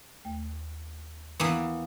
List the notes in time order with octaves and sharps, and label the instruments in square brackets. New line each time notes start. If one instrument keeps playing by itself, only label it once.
[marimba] D#2 A3 G5
[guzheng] E3 A#3 B3